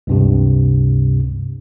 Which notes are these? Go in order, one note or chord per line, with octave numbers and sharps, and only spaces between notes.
C#2 G2 C3